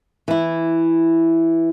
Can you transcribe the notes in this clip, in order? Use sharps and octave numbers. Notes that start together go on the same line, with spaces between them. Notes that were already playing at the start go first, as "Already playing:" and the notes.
E3 E4